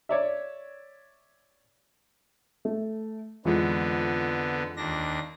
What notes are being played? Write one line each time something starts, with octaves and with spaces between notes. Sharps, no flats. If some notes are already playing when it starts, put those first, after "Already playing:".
C#5 D5 E5
A3
F2 D3 E3 G#3 B3
D#2 D4 A#6